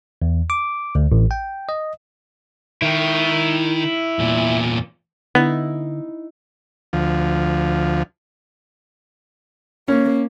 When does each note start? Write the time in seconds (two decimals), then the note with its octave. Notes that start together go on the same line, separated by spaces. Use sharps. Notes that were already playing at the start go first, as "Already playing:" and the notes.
0.22 E2
0.50 D6
0.95 D2
1.12 A1
1.31 G5
1.69 D#5
2.82 D#3 E4 G5
4.19 E2 A#2
5.35 D3 B3 D#4 E4
6.93 D2 F3
9.88 A#3 C#4